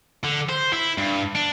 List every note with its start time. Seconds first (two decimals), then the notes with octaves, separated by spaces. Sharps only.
0.24 D3
0.49 C5
0.73 E4
0.98 G2
1.35 D4